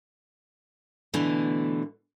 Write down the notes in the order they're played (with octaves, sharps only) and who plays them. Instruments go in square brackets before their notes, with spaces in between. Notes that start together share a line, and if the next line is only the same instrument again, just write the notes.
[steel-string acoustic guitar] B2 D3 E3 A3